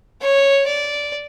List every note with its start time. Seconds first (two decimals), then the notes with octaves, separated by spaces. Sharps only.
0.21 C#5
0.66 D5